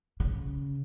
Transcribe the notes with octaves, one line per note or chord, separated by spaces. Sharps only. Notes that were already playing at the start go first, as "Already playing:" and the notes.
C#3